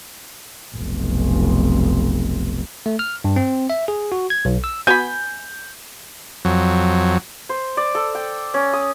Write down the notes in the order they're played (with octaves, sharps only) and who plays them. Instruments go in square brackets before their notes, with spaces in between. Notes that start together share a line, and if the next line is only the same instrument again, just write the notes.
[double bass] F1 B1
[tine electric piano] A3
F6
G2
C4
E5
G#4
F#4
G#6
B1
E6
[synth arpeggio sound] B3 F#4 [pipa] G#5 B5 [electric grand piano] G6
[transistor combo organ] F2 F#3
[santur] C5
D5
A4
G5
C#4
D#6